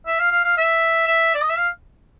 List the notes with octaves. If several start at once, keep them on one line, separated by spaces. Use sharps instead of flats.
E5
F5
F5
F5
E5
E5
D5
D#5
E5
F5